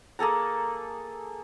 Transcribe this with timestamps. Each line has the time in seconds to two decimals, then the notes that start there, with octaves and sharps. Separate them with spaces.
0.19 A#3 G#4 A4 A#5